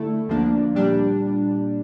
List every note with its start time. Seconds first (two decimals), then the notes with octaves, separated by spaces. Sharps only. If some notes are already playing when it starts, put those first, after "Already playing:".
Already playing: D3 A3 E4 A4
0.29 D2 D3 F3 A#3 D4
0.75 A#2 G3 D4